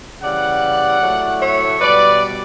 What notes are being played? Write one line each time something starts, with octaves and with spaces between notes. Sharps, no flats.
C#3 E3 G3 D5 F#5
A2 F#3 A3
C#5 E5
B2 G3 B4 D5